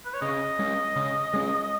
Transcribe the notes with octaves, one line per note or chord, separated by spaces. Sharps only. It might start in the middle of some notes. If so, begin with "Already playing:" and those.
B4
C#5
C#3 D#5
G#3 C#4
C#3
G#3 C#4